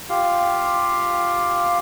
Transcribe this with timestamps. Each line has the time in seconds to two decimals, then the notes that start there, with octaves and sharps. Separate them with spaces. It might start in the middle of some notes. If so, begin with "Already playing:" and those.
0.09 F4 G4 F5